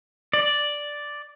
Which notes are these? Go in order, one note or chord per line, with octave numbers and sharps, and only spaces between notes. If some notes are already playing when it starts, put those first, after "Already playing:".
D5